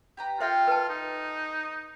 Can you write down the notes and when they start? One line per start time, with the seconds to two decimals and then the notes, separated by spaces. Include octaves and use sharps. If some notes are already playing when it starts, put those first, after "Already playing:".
0.17 G4 B4 A#5
0.40 F4 A4 C5 E5 G5
0.68 B4 A5
0.89 D#4